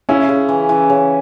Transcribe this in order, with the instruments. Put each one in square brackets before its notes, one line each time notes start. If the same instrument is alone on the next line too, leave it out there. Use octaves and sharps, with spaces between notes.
[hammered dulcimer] C#3 [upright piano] C#4 E4
[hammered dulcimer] C#3
E3
E3
C#3